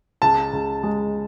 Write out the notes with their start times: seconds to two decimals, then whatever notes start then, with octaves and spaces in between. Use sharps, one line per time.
0.22 C#2 A5
0.53 C#2
0.83 G#3